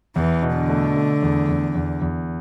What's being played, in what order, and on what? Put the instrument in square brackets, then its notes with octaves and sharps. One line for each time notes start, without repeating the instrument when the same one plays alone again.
[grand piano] E2 [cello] E3
[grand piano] B2
[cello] D3
[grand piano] A3
A3
E2
E2
E2
E2